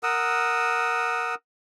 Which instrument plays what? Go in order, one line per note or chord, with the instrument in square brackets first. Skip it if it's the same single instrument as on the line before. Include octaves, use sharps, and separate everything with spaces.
[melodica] A#4 F#5 D#6 E6